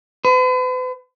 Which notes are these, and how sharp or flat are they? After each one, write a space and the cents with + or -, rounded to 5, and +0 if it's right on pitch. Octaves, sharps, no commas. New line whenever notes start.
B4 +45